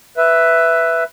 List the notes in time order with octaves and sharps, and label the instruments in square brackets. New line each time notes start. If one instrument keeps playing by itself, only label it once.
[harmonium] B4 E5